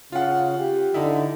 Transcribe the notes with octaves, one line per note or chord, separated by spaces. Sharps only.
C#3 F4 F#5
G4
D3 D#4 E4